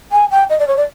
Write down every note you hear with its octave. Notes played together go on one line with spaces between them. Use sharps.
G#5
G5
D#5
D5
C#5
D5